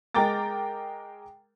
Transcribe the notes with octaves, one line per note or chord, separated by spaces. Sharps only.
G#3 A#4 G5 A#5 D6 A6